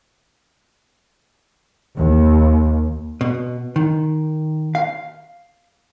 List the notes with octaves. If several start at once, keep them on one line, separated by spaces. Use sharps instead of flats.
D#2
B2
D#3
F5